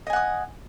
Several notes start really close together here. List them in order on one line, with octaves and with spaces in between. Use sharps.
D#5 G#5 F#5 D#6